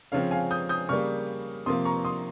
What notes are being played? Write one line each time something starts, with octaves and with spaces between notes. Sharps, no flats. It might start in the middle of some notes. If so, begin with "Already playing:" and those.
C#3 F3 C4 C#5 F5
F5 G#5
D#6 G6
D#6 G6
C#3 G3 A#3 C#6 F6
C3 F3 A#3 C6 D#6
A#5 C#6
C6 D#6